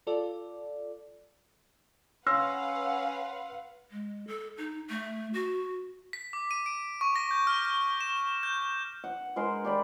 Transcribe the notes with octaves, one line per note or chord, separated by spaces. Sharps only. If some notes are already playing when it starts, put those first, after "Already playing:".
F4 A4 D5
C#4 B4 F5 F#5 C6 E6 A#6
G#3
A4
D#4
A3
F#4
B6
D6
D#7
D7
C#6
A#6
G6
F6
F6
E7
G6
F#5
G#3 A#4 C5 C6
G4 D5 B5